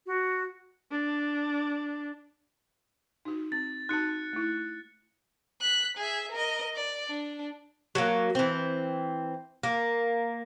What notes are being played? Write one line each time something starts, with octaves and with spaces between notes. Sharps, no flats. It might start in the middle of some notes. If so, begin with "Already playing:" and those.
F#4
D4
D#4 F#4
C4 A6
D#4 F#4 A5 F#6 C#7
A3 E4
F#6 B6
G#4 E5
A#4 D#5
D5
D4
F#3 A#3
E3 C4
A#3